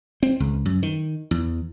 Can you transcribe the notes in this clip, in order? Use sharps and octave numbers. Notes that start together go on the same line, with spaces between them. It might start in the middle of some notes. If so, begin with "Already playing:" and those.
C4
C#2
F#2
D#3
E2